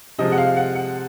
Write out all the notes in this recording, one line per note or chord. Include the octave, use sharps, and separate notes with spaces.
C3 F3 G#3 D#5
F#5
F5
F#5
F#5